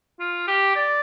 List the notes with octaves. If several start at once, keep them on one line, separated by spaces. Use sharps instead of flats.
F4
G4
D5